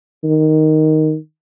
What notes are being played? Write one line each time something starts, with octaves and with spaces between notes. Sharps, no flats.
D#3